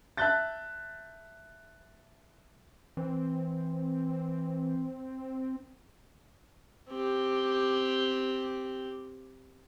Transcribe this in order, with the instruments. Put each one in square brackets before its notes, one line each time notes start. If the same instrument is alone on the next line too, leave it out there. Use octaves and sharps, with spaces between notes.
[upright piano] E5 A5 F#6 G6 A6
[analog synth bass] E3 [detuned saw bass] C4
[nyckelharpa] C4 G4